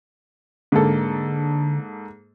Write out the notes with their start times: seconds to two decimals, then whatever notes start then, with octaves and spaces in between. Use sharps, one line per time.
0.72 G#2 D3 A#3 A4